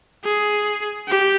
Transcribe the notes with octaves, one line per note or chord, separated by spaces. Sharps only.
G#4
G4